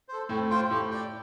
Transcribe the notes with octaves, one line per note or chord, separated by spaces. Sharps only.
A4 C5
A2 A3 C4
F4 C5 G5
A2 A3 G4
D5 G5